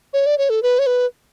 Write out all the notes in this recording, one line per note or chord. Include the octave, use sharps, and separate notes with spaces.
C#5
D5
C#5
A4
B4
C#5
B4